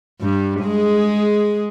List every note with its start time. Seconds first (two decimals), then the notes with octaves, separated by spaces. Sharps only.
0.21 G2 G3
0.61 G#3 G#4